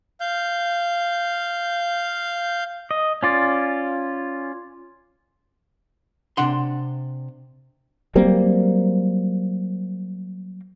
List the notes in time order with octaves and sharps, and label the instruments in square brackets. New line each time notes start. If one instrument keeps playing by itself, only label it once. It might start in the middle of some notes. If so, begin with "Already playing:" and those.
[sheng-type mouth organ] F5 G6
[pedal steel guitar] D#5
C#4 F4 D5
[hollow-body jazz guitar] C3 D4 F#5 C6
[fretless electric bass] F#3 G3 A#3 C4